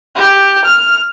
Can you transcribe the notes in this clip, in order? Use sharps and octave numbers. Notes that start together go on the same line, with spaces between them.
G4
F6